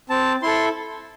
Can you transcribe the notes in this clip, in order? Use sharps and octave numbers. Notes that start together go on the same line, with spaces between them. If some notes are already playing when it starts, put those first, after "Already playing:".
C4 A5
E4 A4 C6